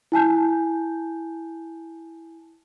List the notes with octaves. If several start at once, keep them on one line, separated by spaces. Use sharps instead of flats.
E4 G#5 A5 G6